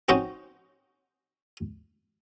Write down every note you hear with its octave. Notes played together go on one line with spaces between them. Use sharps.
C4 C#4 D#4 F#4 C5